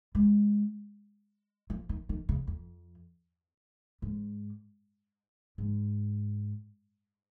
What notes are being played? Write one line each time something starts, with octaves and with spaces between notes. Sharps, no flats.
G#3
F3
D#3
D#3
C#3
F2
G#2
G#2